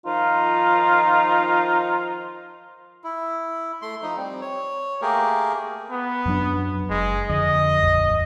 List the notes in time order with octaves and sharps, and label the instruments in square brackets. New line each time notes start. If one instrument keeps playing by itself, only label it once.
[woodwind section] D#3 F3 D#4 F4
[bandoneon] E4
A3 C6
F3 D#4
G3 C4
C#5
A3 A#3 G4 G#4 A#4
[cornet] B3
[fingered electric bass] F#2 F#3 D4
[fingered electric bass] F#1 [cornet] G#3
[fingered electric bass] F2 D3 [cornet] D#5
[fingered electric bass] D#1 A#1 F2